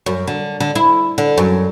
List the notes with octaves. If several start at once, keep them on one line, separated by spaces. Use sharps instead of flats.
F#2
D3
D3
E4
D3
F#2